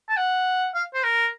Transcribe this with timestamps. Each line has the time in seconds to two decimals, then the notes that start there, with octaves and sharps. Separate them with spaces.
0.09 A5
0.17 F#5
0.74 F5
0.94 C5
1.03 A#4